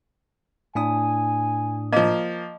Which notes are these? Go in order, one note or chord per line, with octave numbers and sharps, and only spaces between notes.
A2 D4 G#5 D#6
F3 A#3 D#5 F5 A#5